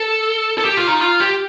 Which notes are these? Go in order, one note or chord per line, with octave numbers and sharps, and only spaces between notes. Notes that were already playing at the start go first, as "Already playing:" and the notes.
Already playing: A4
A4
G4
F4
D#4
F4
G4